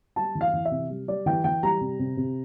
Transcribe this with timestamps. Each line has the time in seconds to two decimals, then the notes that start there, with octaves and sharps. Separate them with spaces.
0.16 G3 A5
0.35 E3
0.41 F5
0.53 E3
0.65 E5
0.71 C3
0.90 G3
1.08 G3 D5
1.26 E3 G5
1.44 E3 G5
1.63 G3 A#5
1.81 C3
1.99 C3
2.17 C3